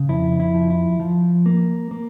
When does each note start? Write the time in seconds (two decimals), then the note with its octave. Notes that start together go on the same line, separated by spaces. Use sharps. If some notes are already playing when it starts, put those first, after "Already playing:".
Already playing: C#3
0.09 F2 E4
0.40 E4
0.54 F3
0.70 E4
1.00 F3
1.46 A#3
1.91 A#3